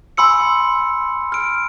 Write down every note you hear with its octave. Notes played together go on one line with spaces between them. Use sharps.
G#5 B5 C6 E6 C#7
F6 D7